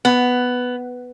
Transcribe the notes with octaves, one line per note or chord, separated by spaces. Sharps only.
B3